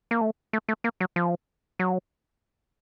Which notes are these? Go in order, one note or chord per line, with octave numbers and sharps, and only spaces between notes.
A#3
A3
A3
A3
A#3
F#3
F3
F#3